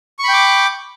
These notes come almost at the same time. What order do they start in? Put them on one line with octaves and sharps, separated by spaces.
C#6 B5 G5 D6